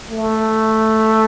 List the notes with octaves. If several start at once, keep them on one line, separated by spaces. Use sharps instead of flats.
A3